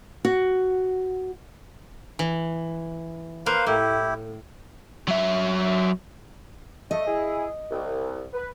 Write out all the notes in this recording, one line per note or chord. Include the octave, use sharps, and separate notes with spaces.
F#4
E3
A#3 B4 C5 F5
A2 E4 G4
F#3 E5
A3 D#5
E4 G#4
C2
B4